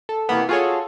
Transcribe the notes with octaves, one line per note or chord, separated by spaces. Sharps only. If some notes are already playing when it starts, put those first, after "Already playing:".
A4
C3 E3 A#3 B3
F4 F#4 G#4 A4 C#5